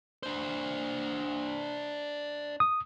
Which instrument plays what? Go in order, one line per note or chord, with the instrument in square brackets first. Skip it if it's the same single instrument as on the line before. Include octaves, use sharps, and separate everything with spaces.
[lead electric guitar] D4 C5
[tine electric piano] D#6